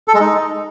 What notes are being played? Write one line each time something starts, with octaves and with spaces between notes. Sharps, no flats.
A4
G#3
D#4